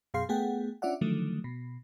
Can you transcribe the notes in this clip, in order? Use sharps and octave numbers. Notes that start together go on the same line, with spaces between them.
F#2 B2 G#4 F5 C6 C7
A3 B3 G#4 F#5 G5
C#4 D4 F4 D5 E5 F#5
D3 D#3 F3 F#3 A3
B2